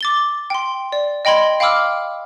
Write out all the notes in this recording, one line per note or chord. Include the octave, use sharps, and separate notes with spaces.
D6 A6 G7
G5 C6
D5
D#5 G5 B5 C6 G#6
F5 G5 B5 D6 E6 F6